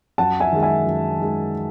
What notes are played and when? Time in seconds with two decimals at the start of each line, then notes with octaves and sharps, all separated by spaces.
0.18 F#2 F#5 A5
0.40 E5 G#5
0.52 D#3 G#3
0.63 E5 G#5
0.85 F#2
1.18 D#3 G#3